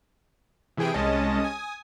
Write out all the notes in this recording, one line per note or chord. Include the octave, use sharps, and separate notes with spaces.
C3 E3 E4 G#4 G5 D7
C2 G#3 C#4 D#5 A5
G#5 D#6